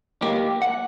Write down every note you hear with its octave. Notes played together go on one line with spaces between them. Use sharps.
A#3 G4
F#5